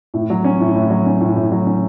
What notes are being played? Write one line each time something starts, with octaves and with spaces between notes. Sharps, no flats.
A2
F#3
C#4
A2
A2
F#3
C#4
A2
A2
F#3
C#4